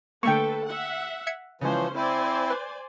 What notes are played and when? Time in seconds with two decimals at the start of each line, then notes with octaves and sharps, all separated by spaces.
0.23 D3 A3 A#3 A4 B4 G5 C#6
0.65 E5 F#5
1.27 E5 G#6 C#7
1.61 C#3 E3 F3 G#3 C#4 C5
1.95 C4 E4 C5 D5 G#5
2.50 B4